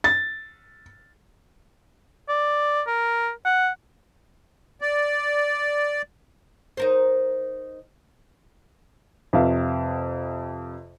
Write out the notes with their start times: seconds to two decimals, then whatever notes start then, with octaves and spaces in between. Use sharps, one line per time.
0.04 A6
2.29 D5
2.87 A#4
3.45 F#5
4.81 D5
6.77 D#4 A#4 C5
9.33 F2 C3 B4 E5 F5